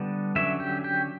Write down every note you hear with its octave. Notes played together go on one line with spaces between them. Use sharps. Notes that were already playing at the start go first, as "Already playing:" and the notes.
Already playing: D3 G3 B3 D4
D3 F#3 C#4 E5
G4
G4